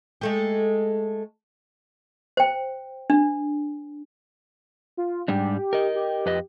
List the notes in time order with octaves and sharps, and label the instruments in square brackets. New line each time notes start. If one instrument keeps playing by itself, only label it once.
[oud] G#3 A3 G4
[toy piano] C5 G5
D4
[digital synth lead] F4
[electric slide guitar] G#2 G3 D4 [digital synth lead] G4
[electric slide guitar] A#4 D#5
[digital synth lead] G4
[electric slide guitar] F2 B4 D#5